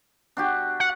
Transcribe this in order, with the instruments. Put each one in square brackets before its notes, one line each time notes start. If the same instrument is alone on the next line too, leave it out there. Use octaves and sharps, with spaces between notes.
[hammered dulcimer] D4 F#4 G4
[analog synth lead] F#5